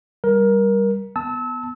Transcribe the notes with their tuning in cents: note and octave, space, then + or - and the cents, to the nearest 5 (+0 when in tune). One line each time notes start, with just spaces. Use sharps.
G3 +0 A#4 +20
B3 +0 A5 +0 E6 -30